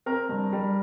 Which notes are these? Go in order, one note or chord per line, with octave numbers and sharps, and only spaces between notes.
C4 A#4 A#5
G2
G3